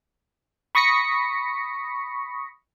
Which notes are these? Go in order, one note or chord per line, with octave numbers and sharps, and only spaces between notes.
B5 C#6 D#6 A#6 B6 C#7